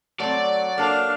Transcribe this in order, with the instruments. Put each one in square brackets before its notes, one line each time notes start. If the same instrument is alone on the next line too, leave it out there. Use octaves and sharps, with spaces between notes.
[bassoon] F#3 [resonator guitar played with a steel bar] A3 C4 [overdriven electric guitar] D5
[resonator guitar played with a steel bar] A#3 A4 [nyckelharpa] D4 F5